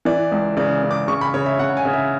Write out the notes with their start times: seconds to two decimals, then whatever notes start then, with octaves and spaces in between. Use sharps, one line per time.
0.05 E3 D5
0.32 C#2
0.57 C#3 D5
0.82 C#3
0.91 D6
1.08 C#3 C#6
1.21 B5
1.34 C#3 C#5
1.46 E5
1.59 C#3 F#5
1.77 G#5
1.85 C#3
1.93 E5